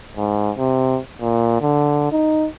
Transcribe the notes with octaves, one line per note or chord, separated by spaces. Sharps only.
G#2
C3
A#2
D3
D#4